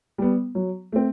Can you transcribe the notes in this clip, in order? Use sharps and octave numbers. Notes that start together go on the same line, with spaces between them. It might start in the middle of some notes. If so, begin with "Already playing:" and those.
G3 B3
F#3
A3 C4